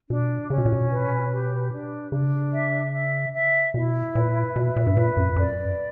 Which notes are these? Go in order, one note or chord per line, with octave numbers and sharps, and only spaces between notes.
B2 D4
C#3 C#4
B2
A#2
B2
B4
G4
D4
C#3 D4
E5
E5
E5
B2 E4
A#2 B4
B2 E5
A#2
G2
A#2 B4
F#2
F#2 D5